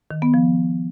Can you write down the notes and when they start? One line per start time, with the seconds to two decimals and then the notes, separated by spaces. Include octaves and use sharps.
0.11 D#3
0.22 B3
0.34 F3